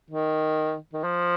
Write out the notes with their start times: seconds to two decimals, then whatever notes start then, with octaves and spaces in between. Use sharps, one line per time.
0.10 D#3
0.93 D#3
1.03 F3